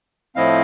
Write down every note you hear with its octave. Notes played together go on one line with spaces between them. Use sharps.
A2 F3 A3 C4 E4 D#5 F5